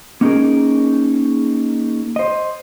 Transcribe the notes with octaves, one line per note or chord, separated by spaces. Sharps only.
A#3 C#4 D#4 F4 G#4 A#4
C5 D#5